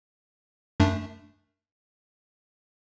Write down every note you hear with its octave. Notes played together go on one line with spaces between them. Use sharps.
F#2 A3 D4